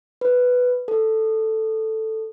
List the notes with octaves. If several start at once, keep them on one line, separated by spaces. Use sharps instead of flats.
B4
A4